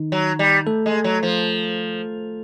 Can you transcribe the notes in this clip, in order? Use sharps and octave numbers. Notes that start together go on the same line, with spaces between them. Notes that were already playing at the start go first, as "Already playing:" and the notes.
Already playing: D#3 D#4
F#3
G3
A3 A4
G#3
F#3
F3